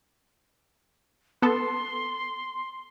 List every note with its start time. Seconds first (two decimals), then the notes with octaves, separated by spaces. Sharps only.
1.42 B3 A4 C6